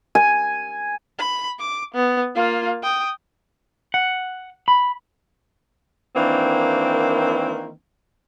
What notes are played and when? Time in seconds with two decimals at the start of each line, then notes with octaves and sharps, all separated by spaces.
0.15 G#5
1.18 B5
1.59 D6
1.94 B3
2.35 A#3 F4
2.83 G5 D#6
3.94 F#5
4.68 B5
6.16 D#3 E3 A#3 C4 D4